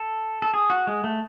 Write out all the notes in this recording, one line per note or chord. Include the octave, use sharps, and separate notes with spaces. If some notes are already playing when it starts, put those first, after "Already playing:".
Already playing: A4
A4
G#4
F#4
G#3
A3